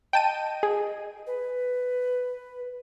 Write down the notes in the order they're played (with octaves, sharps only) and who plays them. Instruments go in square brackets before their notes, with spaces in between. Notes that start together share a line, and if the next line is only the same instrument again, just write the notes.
[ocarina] D#5 [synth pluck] G5 A5 D#7
[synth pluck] G#4
[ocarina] B4